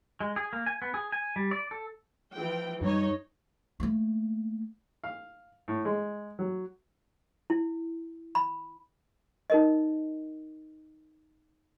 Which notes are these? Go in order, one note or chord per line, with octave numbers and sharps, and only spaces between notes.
G#3
G#4
A#3
G#5
B3
G#4
G#5
G3
D5
A4
E3 F3 G5
F#2 G3 D#4 C#5 D#5
A3 A#3
F5
A2
G#3
F#3
E4
B5
D#4 A#4 D#5